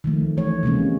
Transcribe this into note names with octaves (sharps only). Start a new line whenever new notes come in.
D#3 F3 A3
E3 F3 A3 C#5
C3 G#3 A#3 C#4